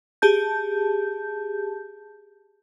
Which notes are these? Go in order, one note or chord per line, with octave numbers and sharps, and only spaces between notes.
G4 G#4 A5 G6